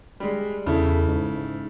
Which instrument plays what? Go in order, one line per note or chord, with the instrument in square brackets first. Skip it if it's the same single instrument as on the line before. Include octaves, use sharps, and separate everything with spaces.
[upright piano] G3 G#3
[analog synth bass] E2 [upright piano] C#3 E4 A4
[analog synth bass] G#2